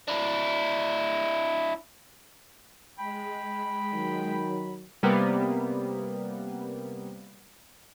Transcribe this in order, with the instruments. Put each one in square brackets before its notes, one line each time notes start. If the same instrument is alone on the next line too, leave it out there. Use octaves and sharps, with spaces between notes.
[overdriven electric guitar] D4 E4
[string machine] G#3 [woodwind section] G5 B5
[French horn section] D#3 F#3
[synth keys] C3 G3 A#3 B3